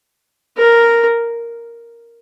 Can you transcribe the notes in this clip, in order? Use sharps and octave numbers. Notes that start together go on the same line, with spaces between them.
A#4